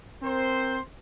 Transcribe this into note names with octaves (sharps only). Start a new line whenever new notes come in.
C4 A#4 C5